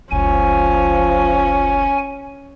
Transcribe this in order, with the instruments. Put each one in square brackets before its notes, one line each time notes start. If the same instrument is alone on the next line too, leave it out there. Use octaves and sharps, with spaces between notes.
[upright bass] F#1 C#2 [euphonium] F3 [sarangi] C#4 [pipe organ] G#5